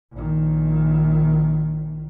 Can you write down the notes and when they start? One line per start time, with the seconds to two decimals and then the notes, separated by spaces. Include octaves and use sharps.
0.13 A#1 D#3